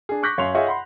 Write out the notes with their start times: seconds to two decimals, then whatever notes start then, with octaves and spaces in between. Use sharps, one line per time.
0.09 D4 G#4
0.23 C#6 D6 F#6 G6 A#6 B6
0.38 F#2 C#5 F5 C6 F7
0.54 F4 G#4 C#5 D#5 E5 F#5
0.67 F#5 B5 C6